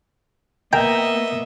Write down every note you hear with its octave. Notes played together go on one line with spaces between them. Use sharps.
A#3 B3 A#4 D#5 E5 G5